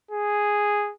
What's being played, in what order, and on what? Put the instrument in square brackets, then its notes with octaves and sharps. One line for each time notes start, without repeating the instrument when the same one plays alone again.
[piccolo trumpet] G#4